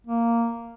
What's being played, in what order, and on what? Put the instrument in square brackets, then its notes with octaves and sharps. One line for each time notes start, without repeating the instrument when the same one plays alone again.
[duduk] A#3